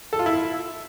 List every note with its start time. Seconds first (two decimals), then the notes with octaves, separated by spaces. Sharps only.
0.13 A4
0.19 F4
0.26 E4